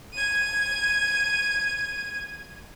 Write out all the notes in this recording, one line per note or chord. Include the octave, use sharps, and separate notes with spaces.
G#6 D#7